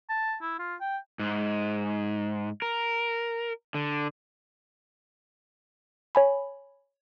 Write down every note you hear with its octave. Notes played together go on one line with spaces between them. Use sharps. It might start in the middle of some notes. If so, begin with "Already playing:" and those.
A5
E4
F4
G5
G#2
A#4
D3
C#5 G#5 B5